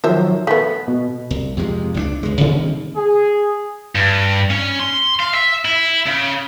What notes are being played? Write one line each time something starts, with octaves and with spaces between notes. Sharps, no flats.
D#3 F3 F#3 C5 E5
A3 B3 B6
B2
C2
F2 C3 G#3
C#2 F3 D4
C#2 G#3
C3 D#3 G3 A#3
G#4
G2
C#4
C6
F5
E5
E4
C#3